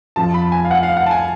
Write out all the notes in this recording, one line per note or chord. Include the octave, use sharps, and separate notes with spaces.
F2 F3 A5
B5
G#5
F5
F#5
F5
F#5
A5
G#5